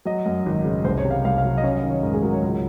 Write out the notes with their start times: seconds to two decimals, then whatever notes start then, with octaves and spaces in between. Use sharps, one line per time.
0.05 F#3 D#5
0.26 F#2
0.46 G#1
0.65 C#3
0.84 C2 C5
0.98 C#5
1.04 C3
1.11 F5
1.24 C2 F5
1.38 F5
1.45 F#3
1.57 D#5
1.63 C#4 F5
1.76 D#5
1.83 D#3
1.91 C#5
2.03 G#2 A#4
2.13 G#4
2.22 F#3 A#4
2.33 C#5
2.42 C#2